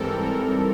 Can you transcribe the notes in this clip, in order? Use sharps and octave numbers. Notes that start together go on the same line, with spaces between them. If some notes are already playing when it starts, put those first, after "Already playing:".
Already playing: G#2 E3 G3 C4 A4 A#4
A#4